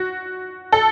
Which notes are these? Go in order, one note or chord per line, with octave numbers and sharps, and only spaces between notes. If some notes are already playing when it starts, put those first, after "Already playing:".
Already playing: F#4
A4